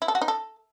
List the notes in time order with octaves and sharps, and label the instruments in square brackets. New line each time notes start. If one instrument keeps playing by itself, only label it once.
[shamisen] E4
A4
F#4
D#4
A4